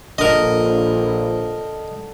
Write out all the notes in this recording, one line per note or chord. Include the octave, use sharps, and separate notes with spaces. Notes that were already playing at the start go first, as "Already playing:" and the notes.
A#1 D3 A#4 D#5